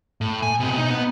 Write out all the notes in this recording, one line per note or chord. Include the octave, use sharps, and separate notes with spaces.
A2
G#5
B2 C4
D#4
B3